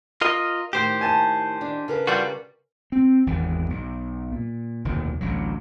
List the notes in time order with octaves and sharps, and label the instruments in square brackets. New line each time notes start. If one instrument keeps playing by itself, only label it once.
[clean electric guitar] F4 A#4 D#5
[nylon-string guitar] A2 D#3 [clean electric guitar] G4 C5
[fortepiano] G#5 A5
[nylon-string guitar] D#3 D4
C#3 A#4 B4
[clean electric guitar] G3 F4 F#4
[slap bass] C4
G#1 E2 G#2 D#3
B1
A#2
F1 D#2 B2 D#3
A1 D2 F#3